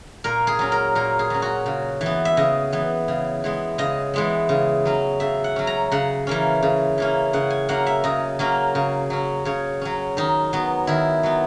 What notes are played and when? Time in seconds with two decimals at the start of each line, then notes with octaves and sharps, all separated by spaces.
0.24 A#2 A#4
0.47 G#4
0.59 F#3 C#4
0.72 A#4
0.95 A#2 A#4
1.19 G#4
1.30 F#3 C#4
1.42 F#4
1.66 C#3
2.01 E3
2.06 B3
2.25 E5
2.37 C#3 D#5
2.72 E3 B3
3.08 C#3
3.44 E3 G#3 B3
3.78 C#3 D#5
4.14 E3 G#3 B3
4.49 C#3
4.85 F#3 C#4
5.20 C#3 E5
5.44 F#5
5.56 F#3 C#4
5.67 A#5
5.92 C#3 F#5
6.27 E3 A#3 C#4
6.62 C#3
6.98 E3 A#3 C#4
7.33 C#3 F#5
7.50 G#5
7.69 F#3 A#3 C#4 F#5
7.86 E5
8.04 C#3 D#5
8.39 F#3 A#3 C#4
8.75 C#3
9.10 F#3 C#4
9.45 C#3 C#5
9.82 F#3 C#4
10.17 D#3 D#4
10.53 F#3 B3
10.87 D#3 E4
11.23 F#3 B3